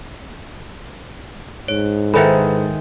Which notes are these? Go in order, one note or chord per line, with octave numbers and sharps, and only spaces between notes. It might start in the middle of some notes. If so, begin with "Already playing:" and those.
G#2 C#5
D#3 G#3 E4 A4 B4 C5 E5 B5